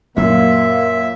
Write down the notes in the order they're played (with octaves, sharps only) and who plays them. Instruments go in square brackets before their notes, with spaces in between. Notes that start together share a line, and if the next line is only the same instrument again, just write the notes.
[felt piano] F#2 A#2 [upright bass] F#3 [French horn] A#3 [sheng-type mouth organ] E5